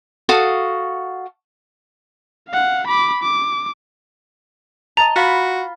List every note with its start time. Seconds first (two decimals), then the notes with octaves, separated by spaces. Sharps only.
0.29 F#4 A4 F5 D#6
2.49 F5 F#5
2.87 B5 D6
3.23 D6
4.97 D#5 A5 A#5
5.16 F4 F#4 B5